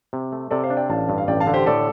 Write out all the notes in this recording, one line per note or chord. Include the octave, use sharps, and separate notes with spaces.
C3
A3
C3 A4 D5
C5 F5
D4
D5 G5
A1 F5 A5
G2
F5
A1 D5 G5
F5 A5
D3
G4 C5
A2 A4 D5